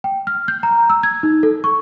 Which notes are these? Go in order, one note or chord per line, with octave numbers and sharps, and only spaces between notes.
G5
F6
G6
A#5
E6
G#6
D#4
A4
C#6